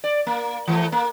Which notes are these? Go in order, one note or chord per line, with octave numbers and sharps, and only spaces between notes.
D5
A#3
E3 G#3 A3
A#3